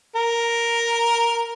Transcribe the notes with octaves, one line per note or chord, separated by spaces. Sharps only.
A#4